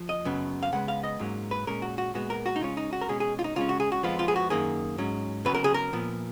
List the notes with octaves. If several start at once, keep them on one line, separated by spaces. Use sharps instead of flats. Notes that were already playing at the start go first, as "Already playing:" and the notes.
Already playing: F3
D#5
F#2 C#3 F#3 B3
F5
C#3 G#3 B3 F#5
F5
D#5
G#2 F#3 A#3 C#4
B4
A#2 G#3 C#4 A#4
F#4
F#4
A#2 G#3 B3 F#4
A#4
F#4
D#4
C#3 G#3 C#4 F4
D#4
F#4
A#4
B2 G#3 C#4 G#4
G#4
F4
D#4
C#3 G#3 C#4 F4
F#4
G#4
F#4
F2 F3 G#3 B3 F4
F4
G#4
F#4
F#2 D#3 A#3 G#4
G#2 F#3 C#4
C#3 F#3 B3 B4
A#4
G#4
A#4
A#2 F3 B3